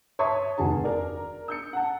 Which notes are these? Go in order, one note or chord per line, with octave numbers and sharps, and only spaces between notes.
C#5 E5 A5 C6 C#6 D#6
F1 D#2 F#4 G#4 A5
A#4 D5
E6 G6 C#7
F#5 A5